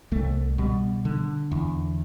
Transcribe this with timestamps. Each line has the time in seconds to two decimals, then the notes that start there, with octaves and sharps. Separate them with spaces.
0.12 C2 A3
0.58 B2 G3
1.05 D3
1.52 E2